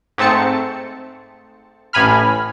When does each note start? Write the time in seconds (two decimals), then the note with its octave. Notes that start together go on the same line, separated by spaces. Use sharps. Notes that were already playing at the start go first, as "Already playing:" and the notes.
0.18 G#2 A3 C4 A5 C#7
1.93 A1 A2 G#5 B5 F6